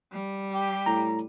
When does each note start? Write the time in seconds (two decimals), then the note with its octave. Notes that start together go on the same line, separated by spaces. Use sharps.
0.13 G3
0.54 G4
0.86 A2 A#5